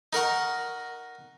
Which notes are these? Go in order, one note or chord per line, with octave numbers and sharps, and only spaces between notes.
D#4 A#4 F#5 C#6